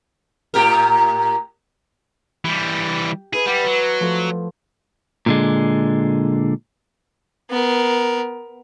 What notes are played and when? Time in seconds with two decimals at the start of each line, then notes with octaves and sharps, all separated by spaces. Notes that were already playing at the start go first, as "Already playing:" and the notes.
0.54 A2 G4 A#4
2.45 E3 G3 G4
3.33 E4 G#4 B4
3.46 G3 F#5 D6 G#6
3.65 F#3
4.00 F3 A3
5.26 A#2 D3 G#3
7.51 B3 A#4